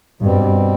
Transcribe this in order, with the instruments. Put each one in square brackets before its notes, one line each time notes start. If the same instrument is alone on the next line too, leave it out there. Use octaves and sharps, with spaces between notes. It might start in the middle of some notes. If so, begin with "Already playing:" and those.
[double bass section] G2 [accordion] B2 G3 C4